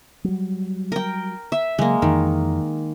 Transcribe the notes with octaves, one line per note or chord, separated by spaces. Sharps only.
F#3 G3
A#4 G5
E5
C#3 F#3 G#3 A#3
F2 D#3 E3